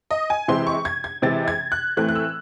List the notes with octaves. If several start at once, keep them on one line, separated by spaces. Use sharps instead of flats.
D#5
G#5
C3 E3 G#3 C4 C6
C#6
G#6
G#6
C3 E3 G#3 C4 A6
G#6
F#6
A2 E3 A3 C4 F#6
F#6
E6